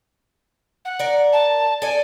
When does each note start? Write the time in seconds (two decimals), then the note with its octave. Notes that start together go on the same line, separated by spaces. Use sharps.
0.85 F#5
0.99 A#4 D5
1.32 A5
1.82 A4 D5 G#5